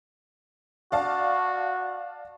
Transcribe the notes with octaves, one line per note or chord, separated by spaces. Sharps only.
F#4 D5 F5 A5